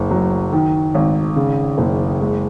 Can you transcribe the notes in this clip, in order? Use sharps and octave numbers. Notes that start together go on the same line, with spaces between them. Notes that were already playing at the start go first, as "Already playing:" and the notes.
Already playing: F#1
F#3
D#3
G#1
C#3
F#1
G#3